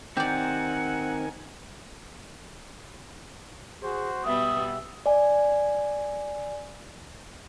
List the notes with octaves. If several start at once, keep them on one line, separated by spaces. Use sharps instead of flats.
D#3 C4 G4 A#4 D5 F#5 G#5
F#4 G#4 C5
B2 G3 B3 E5 D#6
D5 G#5